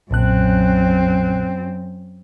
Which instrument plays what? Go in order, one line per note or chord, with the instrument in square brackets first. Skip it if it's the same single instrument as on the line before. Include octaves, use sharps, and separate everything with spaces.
[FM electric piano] B1 A#2 F#6 [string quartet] F#2 C4